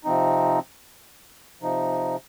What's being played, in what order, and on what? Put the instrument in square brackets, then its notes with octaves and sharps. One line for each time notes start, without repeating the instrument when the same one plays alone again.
[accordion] C3 F3 C4 D#4
C3 F3 D#4